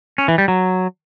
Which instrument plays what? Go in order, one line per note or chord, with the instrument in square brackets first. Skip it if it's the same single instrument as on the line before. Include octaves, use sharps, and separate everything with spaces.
[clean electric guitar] C#4
E3
G3
F#3